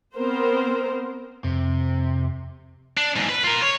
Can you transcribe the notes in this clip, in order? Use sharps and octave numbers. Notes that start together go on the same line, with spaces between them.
B3 C4 A#4 C5
F2 C3
D4
E2 G#2
B4
F4 A#4
C#5